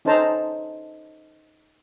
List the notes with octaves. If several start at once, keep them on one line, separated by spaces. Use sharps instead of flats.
C#4 D#4 A4 C5 A5 A#5